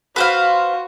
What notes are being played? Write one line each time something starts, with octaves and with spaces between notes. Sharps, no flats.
F#4 B4 C5 F5